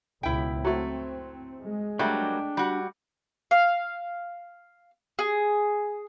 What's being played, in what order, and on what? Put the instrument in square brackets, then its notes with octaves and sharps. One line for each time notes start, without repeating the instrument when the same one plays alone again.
[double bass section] C#2 B2 [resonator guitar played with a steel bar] E4 G5
[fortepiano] F#3 A3 [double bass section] C4
[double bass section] G#3
[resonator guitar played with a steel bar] F#3 G3 A#3 [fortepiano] A3 [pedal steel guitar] D4 G5
[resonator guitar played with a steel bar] G3 F#4
[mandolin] F5
G#4